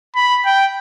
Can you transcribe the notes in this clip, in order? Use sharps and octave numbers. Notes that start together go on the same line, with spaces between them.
B5
G5